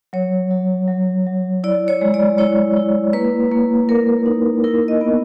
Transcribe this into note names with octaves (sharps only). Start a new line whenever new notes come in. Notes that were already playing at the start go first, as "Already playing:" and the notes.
F#3 C#5
F#3
F#3
F#3
E4 D5
C#5
G#3
D5
E4 C#5
E4
A#3 B4
A#3
A#3 A#4
D#4
E4 A#4
D#5
B3